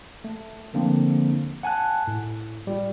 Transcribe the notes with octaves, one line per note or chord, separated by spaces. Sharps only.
A3
D3 F3 A#3 C4 D4
F#5 G#5 A5 F#6
A2
G3 F4